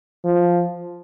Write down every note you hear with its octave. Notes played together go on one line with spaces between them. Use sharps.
F3